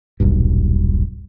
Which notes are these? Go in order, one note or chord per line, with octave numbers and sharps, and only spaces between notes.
D#1 B1 G2